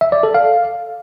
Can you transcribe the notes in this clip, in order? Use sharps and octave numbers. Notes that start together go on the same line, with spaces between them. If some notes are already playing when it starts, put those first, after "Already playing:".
E5
D5
A4
F5